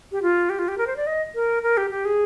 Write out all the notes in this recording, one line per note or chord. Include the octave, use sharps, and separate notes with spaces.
G4
F4
G4
F4
G4
A#4
C5
D5
D#5
A#4
A#4
G4
G4
G#4